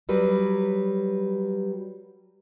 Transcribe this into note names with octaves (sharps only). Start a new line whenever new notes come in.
F#3 G3 B4